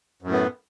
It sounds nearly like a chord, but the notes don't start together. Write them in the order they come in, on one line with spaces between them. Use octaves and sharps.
F#2 A2 B3